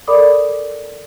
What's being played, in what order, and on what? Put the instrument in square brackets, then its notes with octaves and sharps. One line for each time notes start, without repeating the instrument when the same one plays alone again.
[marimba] A4 A#4 D5 B5 D6 D#6